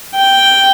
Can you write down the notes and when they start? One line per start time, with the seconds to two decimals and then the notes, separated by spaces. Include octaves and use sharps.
0.15 G5